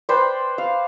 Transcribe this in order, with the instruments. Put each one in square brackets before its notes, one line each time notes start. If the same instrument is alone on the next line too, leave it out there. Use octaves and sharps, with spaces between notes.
[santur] B4 C5 D5 G5
F5